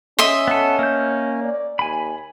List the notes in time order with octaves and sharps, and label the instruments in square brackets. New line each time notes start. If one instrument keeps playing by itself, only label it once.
[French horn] C#4 [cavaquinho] D#5 E5 C6
[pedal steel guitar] B3 A4
A#3 G6
[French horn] D5
[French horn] D#2 [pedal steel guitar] G#5 B5